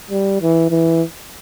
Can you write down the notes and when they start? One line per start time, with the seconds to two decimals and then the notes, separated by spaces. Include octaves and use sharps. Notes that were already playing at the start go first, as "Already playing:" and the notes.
0.11 G3
0.41 E3
0.71 E3